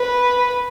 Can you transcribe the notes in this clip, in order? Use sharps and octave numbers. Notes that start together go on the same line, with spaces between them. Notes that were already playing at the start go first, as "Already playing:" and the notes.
Already playing: B4